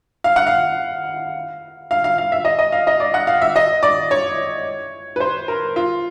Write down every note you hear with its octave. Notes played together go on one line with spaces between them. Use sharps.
F5
F#5
F5
F5
F5
F5
E5
D#5
D#5
F5
D#5
D5
F#5
F5
E5
D#5
D5
C#5
B4
C5
A#4
F4